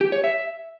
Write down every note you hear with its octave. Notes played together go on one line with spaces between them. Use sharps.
G4
C#5
E5